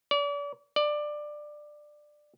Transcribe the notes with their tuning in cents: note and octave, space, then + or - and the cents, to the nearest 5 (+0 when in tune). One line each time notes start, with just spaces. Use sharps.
D5 -40
D5 +15